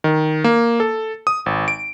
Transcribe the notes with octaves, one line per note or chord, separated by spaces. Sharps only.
D#3
A#3
A4
D#6
G#1
D7